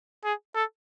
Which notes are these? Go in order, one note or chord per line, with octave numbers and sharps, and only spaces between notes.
G#4
A4